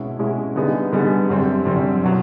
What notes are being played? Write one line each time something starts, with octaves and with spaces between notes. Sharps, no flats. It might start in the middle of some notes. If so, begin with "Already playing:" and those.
Already playing: B2 G#3 C#4 E4
B2 G#3 C#4 E4
D3 G3 B3 D#4 G#4
D3 G3 B3 D#4 G#4
F#2 D3 G3 C4
F#2 D3 G3 C4
B2 F#3